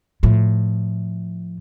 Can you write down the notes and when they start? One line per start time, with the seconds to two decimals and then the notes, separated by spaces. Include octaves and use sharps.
0.23 A2 F3